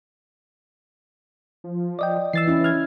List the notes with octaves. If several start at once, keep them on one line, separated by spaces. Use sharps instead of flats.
F3
D5 D#5 G5
E3 E6 A6 C7
C#4 E4
F6 G#6